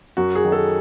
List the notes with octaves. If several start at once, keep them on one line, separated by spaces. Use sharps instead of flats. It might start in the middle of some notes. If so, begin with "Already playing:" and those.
F#2 F#4
G#4
D#3 F#3
A4